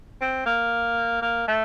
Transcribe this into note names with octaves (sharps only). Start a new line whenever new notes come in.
C4
A#3
A#3
A3